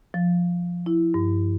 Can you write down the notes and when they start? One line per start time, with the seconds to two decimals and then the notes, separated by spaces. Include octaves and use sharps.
0.14 F3
0.86 E4
1.14 G2